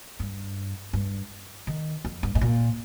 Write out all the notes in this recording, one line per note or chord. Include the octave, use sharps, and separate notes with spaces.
G2
G2
D#3
F2
G2
G#2
A#2